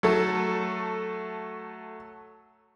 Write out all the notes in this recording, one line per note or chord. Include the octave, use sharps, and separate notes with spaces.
F#3 A3 A4